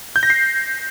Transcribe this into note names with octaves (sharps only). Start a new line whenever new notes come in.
G6
A#6
C7